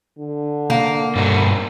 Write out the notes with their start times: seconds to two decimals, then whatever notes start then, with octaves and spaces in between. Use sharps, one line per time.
0.19 D3
0.70 A#3
1.15 G2 B2 F#4